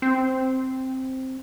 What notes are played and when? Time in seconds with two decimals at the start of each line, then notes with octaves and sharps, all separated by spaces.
0.02 C4